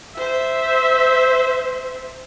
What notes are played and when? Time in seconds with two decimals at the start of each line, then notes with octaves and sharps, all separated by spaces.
0.16 C5 E5